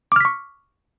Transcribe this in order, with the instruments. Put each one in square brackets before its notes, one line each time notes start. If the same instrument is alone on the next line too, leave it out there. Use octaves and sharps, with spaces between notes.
[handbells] D6
F6
B6
C#6